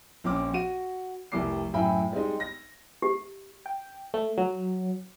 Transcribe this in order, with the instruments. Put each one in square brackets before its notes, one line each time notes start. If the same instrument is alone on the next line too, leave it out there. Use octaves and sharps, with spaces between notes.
[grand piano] A#1 C4 C#4 D6
F#4 D#7
F1 C2 G3 D6 C7
F#2 A2 E5 G5 G#5 B5
G3 G#3 C4 D#4
A#6
[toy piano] G4
[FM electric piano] G5
A3
F#3